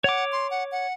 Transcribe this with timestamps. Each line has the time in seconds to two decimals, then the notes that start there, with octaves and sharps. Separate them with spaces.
0.04 C#5 F#5 D6
0.32 C6
0.51 F#5
0.72 F#5